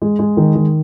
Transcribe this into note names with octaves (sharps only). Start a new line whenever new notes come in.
G#3
G#3
D#3
D#3